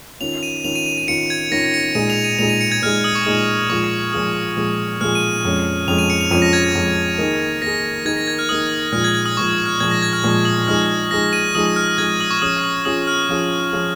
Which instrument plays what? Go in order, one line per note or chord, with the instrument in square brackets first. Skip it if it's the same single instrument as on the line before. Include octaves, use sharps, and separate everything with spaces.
[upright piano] D#3 C#4 F4 [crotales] F7
[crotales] D#7
[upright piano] D#3 C#4 F4 [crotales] F7
[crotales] D#7
D#7
D#7
[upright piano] D#3 C#4 F4 [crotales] C#7
[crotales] G#6
[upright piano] D#3 C#4 F4 [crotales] A#6
[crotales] A#6
C#7
[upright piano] A#2 G#3 D#4 G#4 [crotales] D#7
[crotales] F7
D#7
[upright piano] A#2 G#3 D#4 G#4 [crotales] F7
[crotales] D#7
C#7
G#6
[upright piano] A#2 G#3 D#4 G#4 [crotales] F6
[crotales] D#6
C#6
[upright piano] A#2 G#3 D#4 G#4
[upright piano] A#2 F3 G#3 F4 G#4 [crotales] C#6
[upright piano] A#2 F3 G#3 F4 G#4 [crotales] D#6
[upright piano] A#2 F3 G#3 F4 G#4
[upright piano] A#2 F3 G#3 F4 G#4 [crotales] F6
[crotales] D#7
[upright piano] F2 F3 G#3 C#4
[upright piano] F2 F3 G#3 C#4 [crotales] F7
[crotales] D#7
C#7
F7
[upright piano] F2 F3 G#3 C#4 [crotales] D#7
[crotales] A#6
G#6
A#6
[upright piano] F2 F3 G#3 C#4
D#3 A#3 D#4 G#4
[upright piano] D#3 A#3 D#4 G#4 [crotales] A#6
[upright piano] D#3 A#3 D#4 G#4 [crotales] G#6
[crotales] A#6
G#6
F6
[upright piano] D#3 A#3 D#4 G#4 [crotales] D#6
[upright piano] A#2 F3 G#3 [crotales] F6
[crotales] G#6
G#6
D#6
[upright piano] A#2 F3 G#3 [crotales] C#6
[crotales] F6
[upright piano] A#2 F3 G#3 [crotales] G#6
[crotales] A#6
G#6
F6
[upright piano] A#2 F3 G#3
[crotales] D#6
[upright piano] F3 G#3 D#4 G#4 [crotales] F6
[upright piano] F3 G#3 D#4 G#4 [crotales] A#6
[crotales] D#7
[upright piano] F3 G#3 D#4 G#4 [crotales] D#6
[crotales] D#6
F6
F6
[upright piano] F3 G#3 D#4 G#4 [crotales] G#6
[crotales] D#6
C#6
[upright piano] F3 C#4 F4 G#4 [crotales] D#6
[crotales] D#6
[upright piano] F3 C#4 F4 G#4 [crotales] D#6
[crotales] F6
[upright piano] F3 C#4 F4 G#4
F3 C#4 F4 G#4